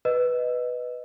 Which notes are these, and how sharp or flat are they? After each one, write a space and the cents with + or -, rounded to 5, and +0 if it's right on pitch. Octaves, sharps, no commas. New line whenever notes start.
B4 +0 D#5 -5